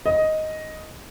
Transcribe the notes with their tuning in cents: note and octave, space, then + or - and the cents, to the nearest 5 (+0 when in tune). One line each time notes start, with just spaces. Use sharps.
D#5 +5